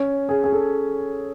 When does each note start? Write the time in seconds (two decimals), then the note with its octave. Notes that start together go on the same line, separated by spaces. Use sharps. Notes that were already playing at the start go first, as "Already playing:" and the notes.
Already playing: C#4
0.29 G#4
0.44 G#4
0.52 A4